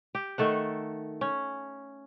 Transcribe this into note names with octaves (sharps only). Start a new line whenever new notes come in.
G4
D#3 A3 A4 F#5
C#4